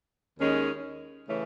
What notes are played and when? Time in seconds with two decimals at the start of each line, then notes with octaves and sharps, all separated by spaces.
0.39 D#2 D#3 G#3 C#4
1.27 C#3 E3 A3 C#4